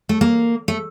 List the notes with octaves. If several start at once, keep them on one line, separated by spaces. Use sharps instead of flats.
A3
A#3
A3